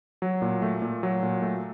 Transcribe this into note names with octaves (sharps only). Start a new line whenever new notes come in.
F#3
A#2
A3
A#2
F#3
A#2
A3